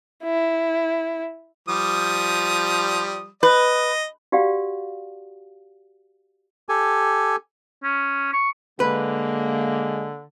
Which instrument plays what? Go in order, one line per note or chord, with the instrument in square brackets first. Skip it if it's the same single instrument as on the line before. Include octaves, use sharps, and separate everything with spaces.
[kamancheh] E4
[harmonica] F3 G3 D#6
[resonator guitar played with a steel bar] B4 [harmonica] D#5
[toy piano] F#4 G4 D5 F5 F#5
[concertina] G4 A4 G#5
[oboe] C#4
C#6
[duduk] D3 [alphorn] G#3 [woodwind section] A#3 [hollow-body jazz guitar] B4